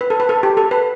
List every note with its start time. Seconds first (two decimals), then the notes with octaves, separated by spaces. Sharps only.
0.01 B4
0.10 A4
0.20 B4
0.29 A4
0.43 G4
0.57 A4
0.71 B4